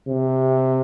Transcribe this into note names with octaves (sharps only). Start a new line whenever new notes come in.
C3